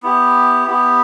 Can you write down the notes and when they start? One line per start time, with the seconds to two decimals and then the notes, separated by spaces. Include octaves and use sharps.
0.03 B3 E4 G4
0.67 B3 E4 G4